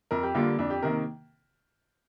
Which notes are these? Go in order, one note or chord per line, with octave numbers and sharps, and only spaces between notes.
F2 A#4
G4
D3 G3 A#3 F4
F2 D4
G4
C3 D#3 A#3 A#4